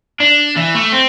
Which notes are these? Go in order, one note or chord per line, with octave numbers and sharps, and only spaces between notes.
D4
E3
A3
C4